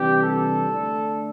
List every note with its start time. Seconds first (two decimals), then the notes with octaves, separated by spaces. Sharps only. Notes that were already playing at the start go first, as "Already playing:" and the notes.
Already playing: C3 E3 G3 D4 G4
0.23 A4
0.71 D3 A3 D4